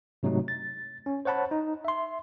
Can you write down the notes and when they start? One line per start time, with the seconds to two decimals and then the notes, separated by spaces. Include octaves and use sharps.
0.23 G#2 C3 F#3 A3 D#4
0.48 A6
1.06 C#4
1.25 C5 C#5 F#5 A5 B5
1.51 D#4
1.85 E5 C6